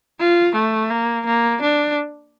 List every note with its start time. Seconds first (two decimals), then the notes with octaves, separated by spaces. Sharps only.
0.19 F4
0.55 A3
0.90 A#3
1.26 A#3
1.62 D4